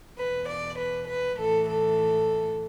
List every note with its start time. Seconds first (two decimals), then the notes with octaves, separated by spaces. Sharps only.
0.17 E2 B2 B4
0.47 D5
0.78 B4
1.08 B4
1.37 A2 E3 A4
1.67 A4